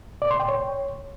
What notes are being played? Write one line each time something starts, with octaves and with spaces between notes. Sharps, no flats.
D5
C6
G5
C#5